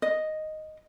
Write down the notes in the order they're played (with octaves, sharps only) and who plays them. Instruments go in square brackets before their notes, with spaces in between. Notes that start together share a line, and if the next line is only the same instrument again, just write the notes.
[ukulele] D#5